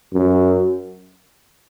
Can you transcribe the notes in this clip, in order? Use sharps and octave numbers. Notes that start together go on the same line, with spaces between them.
F#2